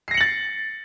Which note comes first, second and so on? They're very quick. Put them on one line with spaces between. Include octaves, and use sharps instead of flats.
C7 A#6 C#7 F#7 A6